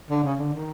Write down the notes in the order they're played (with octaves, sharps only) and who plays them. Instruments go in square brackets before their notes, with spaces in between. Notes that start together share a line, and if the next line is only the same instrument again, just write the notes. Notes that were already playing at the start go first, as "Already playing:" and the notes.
[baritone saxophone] D3
C#3
D3
D#3